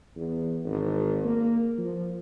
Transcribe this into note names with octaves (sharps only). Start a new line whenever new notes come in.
E2
G#1
A#3
F3